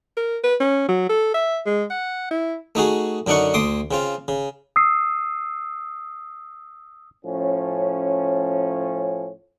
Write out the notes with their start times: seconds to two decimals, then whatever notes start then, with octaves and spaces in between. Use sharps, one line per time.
0.17 A#4
0.44 B4
0.60 C#4
0.89 F#3
1.09 A4
1.34 E5
1.66 G#3
1.90 F#5
2.31 E4
2.75 A3 D#4 F#4 G#4
3.27 F#2 D3 D4 D#4 F#5 C#6
3.54 D2 A3 C6 D6 D#6
3.91 C#3 C4 F4
4.28 C#3
4.76 D#6 E6 C7
7.26 A2 F3 C#4